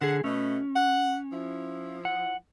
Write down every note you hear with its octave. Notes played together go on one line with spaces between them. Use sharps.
D3 G#4 F#5
B2 A3 C#4
F#5
F3 E4
F#5